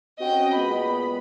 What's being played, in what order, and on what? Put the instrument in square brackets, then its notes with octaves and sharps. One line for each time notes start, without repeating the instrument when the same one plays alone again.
[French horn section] C4 C#4 F#4 [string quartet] D#5 G5
[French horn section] A#2 G#3 B3 [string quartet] B5